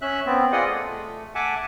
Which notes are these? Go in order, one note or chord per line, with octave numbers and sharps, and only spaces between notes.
C#4 E5 F#6
B3 C4
F4 G#4 D5 D#5 F#5
A3
E5 F#5 G#5 A5 D6